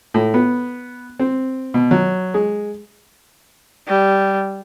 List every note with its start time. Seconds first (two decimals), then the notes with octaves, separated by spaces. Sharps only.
0.14 A2
0.34 B3
1.19 C4
1.74 B2
1.91 F#3
2.34 G#3
3.87 G3